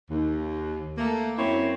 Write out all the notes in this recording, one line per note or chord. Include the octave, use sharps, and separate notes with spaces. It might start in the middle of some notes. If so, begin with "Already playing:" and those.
D#2
A3 A#3
F#2 C4 E4 C#5